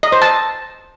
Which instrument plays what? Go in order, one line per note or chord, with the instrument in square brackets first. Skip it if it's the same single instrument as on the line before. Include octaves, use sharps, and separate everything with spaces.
[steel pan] D#5
C5
A5